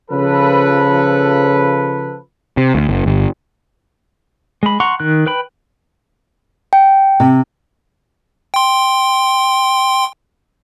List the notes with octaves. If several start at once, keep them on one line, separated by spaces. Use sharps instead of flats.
C#3 F3 A4 B4
C3
D2
F#1
G1
G#3 B5
F#5 A#5 C6 C#6
D#3 F#6
B4 G5 B5
G5
C3
G5 C6